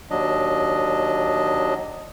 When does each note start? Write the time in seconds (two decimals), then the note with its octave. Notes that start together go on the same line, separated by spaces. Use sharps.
0.10 D#2 F#3 D4 D#5